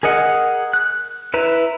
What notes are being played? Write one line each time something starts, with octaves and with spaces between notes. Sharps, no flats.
G#4 A#4 D#5 F#5
F#6
E4 B4 A#5